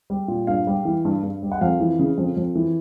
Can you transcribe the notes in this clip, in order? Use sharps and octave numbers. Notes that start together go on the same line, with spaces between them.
G3
A#2
G2 F5
G3
E3
G2
G2
G3
F#5
F2 F5
E3
C#3
F2
F2
E3